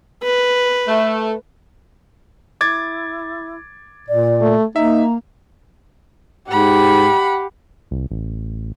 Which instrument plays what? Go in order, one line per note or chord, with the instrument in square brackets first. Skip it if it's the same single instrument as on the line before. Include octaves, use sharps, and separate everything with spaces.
[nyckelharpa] B4
[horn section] A3
[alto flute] E4 [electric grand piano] D6 G#6 A6
[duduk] A#2 [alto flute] D5
[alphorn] A3
[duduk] A#3 [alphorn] D#4 [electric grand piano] E5 [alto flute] A#5
[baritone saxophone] G#2 [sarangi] G4 [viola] F#5 B5
[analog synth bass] C2
A1